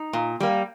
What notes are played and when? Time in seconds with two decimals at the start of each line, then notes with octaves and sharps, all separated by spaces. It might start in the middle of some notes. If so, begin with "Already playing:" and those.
Already playing: D#4
0.13 A#2
0.40 G3 A#3